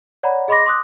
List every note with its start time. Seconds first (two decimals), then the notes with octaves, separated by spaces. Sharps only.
0.23 C#5 D5 F#5 A#5 B5
0.48 G#4 D#5 B5 C6 D6 A#6
0.66 C6 D6 D#6 F#6